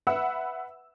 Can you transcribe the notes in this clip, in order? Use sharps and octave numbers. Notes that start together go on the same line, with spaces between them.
B4 E5 F#5 B5 E6